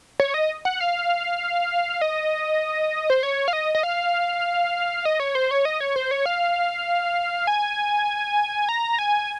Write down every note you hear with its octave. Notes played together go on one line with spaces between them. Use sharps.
C#5
D#5
F#5
F5
D#5
C5
C#5
F5
D#5
D#5
F5
D#5
C#5
C5
C#5
D#5
C#5
C5
C#5
F5
G#5
A#5
G#5